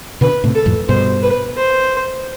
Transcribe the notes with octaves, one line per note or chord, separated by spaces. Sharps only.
B2 D3 B4
A2 C3
A4
F2 A2
G2 B2 C5
B4
C5